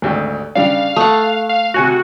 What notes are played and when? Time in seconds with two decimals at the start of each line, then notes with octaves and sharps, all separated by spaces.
0.02 G#1 D2 G4
0.55 C#3 G3 D4 F5
0.96 A3 F#5 D#6
1.49 F5
1.74 C3 F#4 G#5 F#6